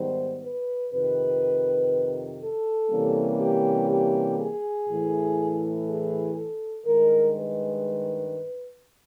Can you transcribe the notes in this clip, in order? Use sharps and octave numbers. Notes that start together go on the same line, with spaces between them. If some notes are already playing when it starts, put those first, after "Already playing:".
Already playing: G#2 D#3 G3 B3 C5
B4
F2 C3 D#3 B4
A4
C3 E3 G3 A#3 C#4
G4
G4
G#4
A2 E3 A3
G#4
A4
G2 D#3 G#3 A#4
B4